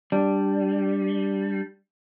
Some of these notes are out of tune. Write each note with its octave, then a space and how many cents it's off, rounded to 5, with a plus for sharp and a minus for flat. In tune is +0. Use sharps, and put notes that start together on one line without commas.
G3 +0 D4 +0